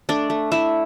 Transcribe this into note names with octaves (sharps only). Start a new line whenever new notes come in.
A3 D4 D5
A3
A3 E4 E5